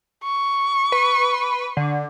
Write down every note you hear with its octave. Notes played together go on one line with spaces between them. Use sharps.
C#6
B4
D3